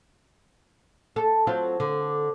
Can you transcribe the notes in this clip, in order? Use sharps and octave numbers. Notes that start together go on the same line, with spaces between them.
A4
F#3 C4 F4
D3